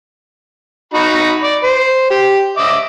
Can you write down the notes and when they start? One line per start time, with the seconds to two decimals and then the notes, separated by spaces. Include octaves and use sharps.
0.94 D#4 F#4 B5
1.43 D5
1.63 C5
2.10 G4
2.57 D#5 E5 D6